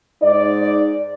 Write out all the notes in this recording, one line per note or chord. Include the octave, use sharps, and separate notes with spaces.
G#2 D#4 D5